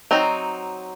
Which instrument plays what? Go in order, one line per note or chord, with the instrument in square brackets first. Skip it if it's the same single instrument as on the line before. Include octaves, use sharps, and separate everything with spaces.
[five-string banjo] F#3 C4 D#4